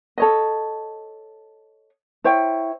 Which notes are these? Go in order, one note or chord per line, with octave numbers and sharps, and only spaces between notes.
A4 C#5 D#5
E4 C5 C#5 G5